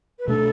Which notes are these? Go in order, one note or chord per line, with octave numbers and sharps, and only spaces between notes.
B4
B2 A3 D4 A4